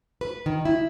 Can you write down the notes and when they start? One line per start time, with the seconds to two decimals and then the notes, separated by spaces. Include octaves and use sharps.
0.21 B4
0.46 D#3
0.65 E4